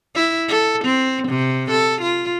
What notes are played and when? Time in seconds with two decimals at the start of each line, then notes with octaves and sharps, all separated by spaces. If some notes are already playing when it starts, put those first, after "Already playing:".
0.15 E4
0.48 A4
0.85 C4
1.28 C3
1.70 A4
2.01 F4